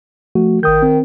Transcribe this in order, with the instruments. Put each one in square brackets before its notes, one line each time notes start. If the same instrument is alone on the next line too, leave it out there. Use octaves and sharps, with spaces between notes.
[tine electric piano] F3 A3 F#4
[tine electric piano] A1 D#6 G6 [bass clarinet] D#3
[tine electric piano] C4